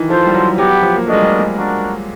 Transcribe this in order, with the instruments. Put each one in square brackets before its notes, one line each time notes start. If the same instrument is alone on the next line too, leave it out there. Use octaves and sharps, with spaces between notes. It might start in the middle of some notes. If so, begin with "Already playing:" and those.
Already playing: [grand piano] D#3 E3
[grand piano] F3 [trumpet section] F4 A4 C5
[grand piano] G3
F#3
[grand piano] F#3 [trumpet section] B3 E4 G4
[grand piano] F3
A#3
[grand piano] A3 [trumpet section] D4 F#4 A#4 D#5
[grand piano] G#3
G3
G#3
[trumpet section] D4 F#4 A#4